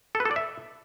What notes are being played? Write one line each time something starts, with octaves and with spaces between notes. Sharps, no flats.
A4
B4
A4
D5
E5